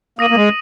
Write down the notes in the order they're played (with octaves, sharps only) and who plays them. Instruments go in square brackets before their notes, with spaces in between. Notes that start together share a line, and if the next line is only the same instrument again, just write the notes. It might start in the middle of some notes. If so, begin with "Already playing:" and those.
[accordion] A#3 [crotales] D#6 A#6 D#7 F#7
[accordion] A#3
G#3